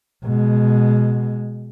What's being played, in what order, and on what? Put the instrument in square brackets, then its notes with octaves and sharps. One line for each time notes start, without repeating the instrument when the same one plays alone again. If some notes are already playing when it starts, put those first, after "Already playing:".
[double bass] B2 G#3